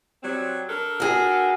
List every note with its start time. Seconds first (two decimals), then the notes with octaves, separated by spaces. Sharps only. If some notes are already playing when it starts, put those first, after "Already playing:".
0.23 F#3 G3 C4
0.69 D4 A4 A#4
1.00 F#4 G#4